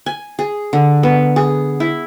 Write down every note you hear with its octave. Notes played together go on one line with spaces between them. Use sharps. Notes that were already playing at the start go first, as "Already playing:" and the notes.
G#5
G#4
D3
B3
G#4
E4